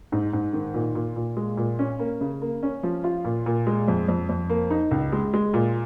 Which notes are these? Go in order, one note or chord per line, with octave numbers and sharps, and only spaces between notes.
G#2
G#2
D#3
A#2
A#2
A#2
G#3
A#2
C#4
A#3
C#3
A#3
C#4
F3
F4
A#2
A#2
G#3
F2
F2
F2
A#3
D#4
C#2
G#3
G#3
A#2